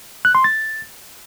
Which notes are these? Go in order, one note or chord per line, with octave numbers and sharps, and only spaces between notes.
F#6
C6
A6